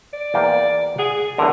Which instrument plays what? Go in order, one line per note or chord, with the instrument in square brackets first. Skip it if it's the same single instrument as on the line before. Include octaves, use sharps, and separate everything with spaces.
[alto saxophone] D5
[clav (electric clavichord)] E2 A#3 G5
[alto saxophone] G#4 [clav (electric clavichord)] F#5
[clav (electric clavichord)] E2 D3 [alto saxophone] A#4